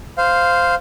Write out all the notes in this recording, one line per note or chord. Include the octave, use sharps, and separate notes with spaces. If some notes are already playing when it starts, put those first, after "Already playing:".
C5 F5